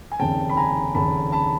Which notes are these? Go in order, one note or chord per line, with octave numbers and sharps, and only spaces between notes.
G#5
F1 D#2 C#3 G5 A5
B5
G#5 A#5
F1 D#2 C#3 A5 B5
A5 B5